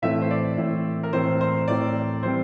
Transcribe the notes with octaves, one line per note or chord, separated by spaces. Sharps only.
A2 E3 A3 C4 E4 E5
C5
D5
A2 E3 A3 C4 E4
A#4
A2 E3 A3 C4 E4 C5
C5
A2 E3 A3 C4 E4 D5
E3 G3 C4 C5